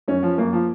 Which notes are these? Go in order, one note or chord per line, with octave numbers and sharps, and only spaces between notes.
F#2 C#4
F3
F#2 A#3
F3